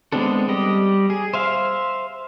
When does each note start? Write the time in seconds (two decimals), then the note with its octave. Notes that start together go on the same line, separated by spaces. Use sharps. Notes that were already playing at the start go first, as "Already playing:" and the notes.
0.12 G#3 B3 C4 D4 A4
0.48 G3 G4 D#5
1.10 G#4
1.34 C5 E5 F5